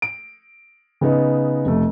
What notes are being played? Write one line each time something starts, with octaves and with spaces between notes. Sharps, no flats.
D7
C#3 B3 D#4
F1 A3